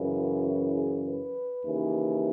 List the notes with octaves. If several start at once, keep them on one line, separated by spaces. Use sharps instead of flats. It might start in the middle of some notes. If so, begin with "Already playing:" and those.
Already playing: F#2 C#3 E3
E4
G#4
B4
D#2 C#3 E3